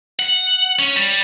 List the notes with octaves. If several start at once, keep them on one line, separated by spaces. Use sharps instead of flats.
F#5
C#4
G3